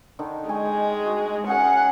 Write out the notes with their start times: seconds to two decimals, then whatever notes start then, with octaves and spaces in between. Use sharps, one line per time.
0.19 D3 D#3 D#4
0.49 G#3 G5 G#5 C#6
1.06 F#4
1.47 C#4 G#4 A#4 F#5